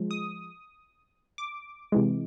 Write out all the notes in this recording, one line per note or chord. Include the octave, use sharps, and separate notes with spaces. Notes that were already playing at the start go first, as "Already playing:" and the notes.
Already playing: F3 G#3
D#6
D6
C3 E3 G#3